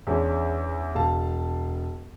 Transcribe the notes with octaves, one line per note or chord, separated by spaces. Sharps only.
E2 G#3 C#4 D4
E1 F5 A5